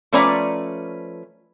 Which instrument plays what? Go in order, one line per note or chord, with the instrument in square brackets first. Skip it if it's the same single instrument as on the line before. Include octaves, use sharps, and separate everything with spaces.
[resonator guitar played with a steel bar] F3 A3 C#4 B4 D5 A#5